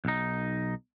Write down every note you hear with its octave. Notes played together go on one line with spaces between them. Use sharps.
B1 D#4